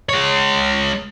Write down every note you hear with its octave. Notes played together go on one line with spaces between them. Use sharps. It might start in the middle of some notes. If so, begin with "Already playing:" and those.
G#3 C#5